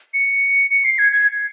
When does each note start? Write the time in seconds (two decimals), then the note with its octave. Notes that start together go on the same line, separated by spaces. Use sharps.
0.14 C#7
0.70 C#7
0.85 C7
0.99 G#6
1.12 G#6